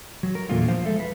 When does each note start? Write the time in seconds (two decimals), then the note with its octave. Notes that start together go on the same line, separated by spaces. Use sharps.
0.23 F#3
0.35 A#4
0.49 E2 A#2 D3 A3 F4
0.69 F3 C5 F5
0.85 G#3 A4 E5
1.00 B4